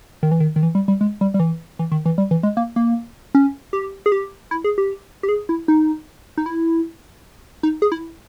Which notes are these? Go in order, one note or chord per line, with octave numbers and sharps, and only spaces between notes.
D#3
E3
D#3
D#3
E3
G3
G3
G#3
G3
G3
E3
E3
D#3
E3
G3
E3
G#3
A#3
A#3
C#4
G4
G#4
G4
E4
G#4
G4
G4
G#4
E4
D#4
D#4
E4
D#4
G#4
E4